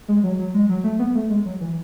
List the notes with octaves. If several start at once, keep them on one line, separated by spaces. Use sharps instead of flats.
G#3
F#3
F#3
G#3
F#3
A3
B3
A3
G#3
F#3
E3